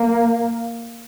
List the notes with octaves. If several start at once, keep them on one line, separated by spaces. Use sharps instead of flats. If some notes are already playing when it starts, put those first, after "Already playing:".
Already playing: A#3